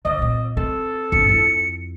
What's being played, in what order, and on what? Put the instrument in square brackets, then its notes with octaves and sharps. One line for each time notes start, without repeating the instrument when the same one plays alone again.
[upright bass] D3 [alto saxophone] D#5
[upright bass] A#2 C4
[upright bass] C4 [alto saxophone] A4
[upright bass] G1 C4 [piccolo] C#7
[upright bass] F2 E4